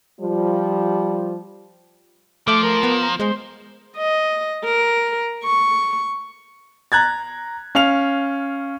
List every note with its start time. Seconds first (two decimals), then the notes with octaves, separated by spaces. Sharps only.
0.21 F3 G3
2.48 F3 A3 D6
2.63 A#4
2.83 B3
3.02 A#5
3.20 G#3 C5
3.97 D#5
4.64 A#4
5.44 C#6
6.92 A#5 F#6 G#6 A6
7.75 C#4 F5 F6 F7